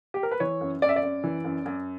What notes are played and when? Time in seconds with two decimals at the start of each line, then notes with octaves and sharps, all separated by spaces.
0.14 G4
0.23 A#4
0.31 B4
0.40 E3 C#5
0.61 F#2
0.82 F#2 D5
0.89 E5
0.96 D5
1.02 F#2
1.24 E3
1.44 F#2
1.66 F#2